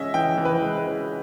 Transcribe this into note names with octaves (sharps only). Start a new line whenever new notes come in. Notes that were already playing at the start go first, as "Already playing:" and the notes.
Already playing: E3 G#3 C#4 D#5 E5
E3 G5
E3
B4
G#3
B4
C#4